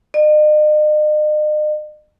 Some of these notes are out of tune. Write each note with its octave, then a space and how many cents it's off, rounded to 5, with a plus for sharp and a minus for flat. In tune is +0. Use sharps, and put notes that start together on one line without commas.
D#5 -45